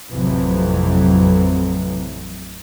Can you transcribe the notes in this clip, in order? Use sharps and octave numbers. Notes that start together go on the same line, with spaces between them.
A1 F2 C3 E3 F#3